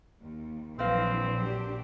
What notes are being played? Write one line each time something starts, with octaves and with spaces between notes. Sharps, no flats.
D#2
A#1 E3 F#3 C4 B4 D#5 F5
F#3 D4 G4